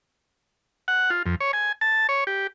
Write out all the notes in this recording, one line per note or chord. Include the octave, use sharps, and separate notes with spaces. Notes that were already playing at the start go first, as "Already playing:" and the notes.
F#5
F4
F2
C#5
G#5
A5
C#5
G4